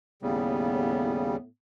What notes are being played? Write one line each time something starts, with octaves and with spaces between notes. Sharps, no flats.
D#2 A2 C#3 G3 B3